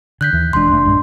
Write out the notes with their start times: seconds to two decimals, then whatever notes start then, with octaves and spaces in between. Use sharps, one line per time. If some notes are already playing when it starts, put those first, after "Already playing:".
0.21 D3 F#6 G6 B6
0.33 D#2 E3
0.53 E1 E2 G#3 D4 C6
0.71 F1 A3
0.85 A#1 G2 G#3